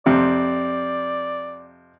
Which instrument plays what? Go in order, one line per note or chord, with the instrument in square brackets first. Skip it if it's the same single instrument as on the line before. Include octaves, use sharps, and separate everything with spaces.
[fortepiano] F2 C3 [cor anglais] D5